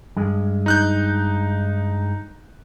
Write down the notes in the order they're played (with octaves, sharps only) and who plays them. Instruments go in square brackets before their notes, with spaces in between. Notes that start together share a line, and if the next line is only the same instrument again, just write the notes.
[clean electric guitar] G2 G#3
[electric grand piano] D#4 F#6 G6